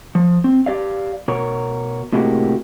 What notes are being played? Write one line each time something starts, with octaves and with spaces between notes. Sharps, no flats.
F3
C4
G4 D5 F5
B2 A#4 C#5
A2 C3 G#3 A#3 F#4 G4